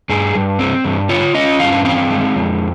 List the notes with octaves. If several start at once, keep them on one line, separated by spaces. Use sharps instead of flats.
G2 G#4
G2
C4
G2
F4 C#5
C#4 D#5
G2 F5
C4 F5
G#3
F2